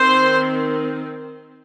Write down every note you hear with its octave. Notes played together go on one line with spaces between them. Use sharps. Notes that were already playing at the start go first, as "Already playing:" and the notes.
Already playing: D#3 C4 C5 C6